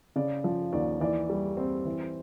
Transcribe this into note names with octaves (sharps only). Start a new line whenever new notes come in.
C#3 D5
F3
D#2 D5
E3 D5
G3
C4
E3